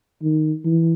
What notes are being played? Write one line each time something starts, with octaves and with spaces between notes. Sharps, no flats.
D#3
E3